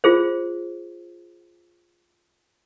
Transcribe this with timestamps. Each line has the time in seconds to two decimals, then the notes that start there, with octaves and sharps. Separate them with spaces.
0.04 F4 G#4 C5